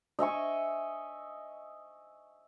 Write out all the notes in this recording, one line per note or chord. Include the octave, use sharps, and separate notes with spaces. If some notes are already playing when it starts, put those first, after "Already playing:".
D#5 E5 G#5 C#6